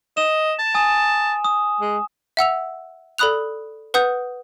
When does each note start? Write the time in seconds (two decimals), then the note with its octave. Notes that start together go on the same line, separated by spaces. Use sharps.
0.17 D#5 E7
0.59 A5
0.75 G#5 D#6
1.45 D#6
1.80 G#3
2.37 E5 F#5 E6 F7
3.18 A4 D5 B5 D#6 F#6 F7
3.94 B4 F#5 D#6 G6